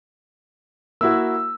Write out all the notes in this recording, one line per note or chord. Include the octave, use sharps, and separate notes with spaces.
A#3 E4 F#4 E6